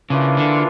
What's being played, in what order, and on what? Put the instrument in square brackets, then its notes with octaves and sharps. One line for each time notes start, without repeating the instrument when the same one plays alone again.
[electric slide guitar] C#3 [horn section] E3 A#3 D4 F4
[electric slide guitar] D3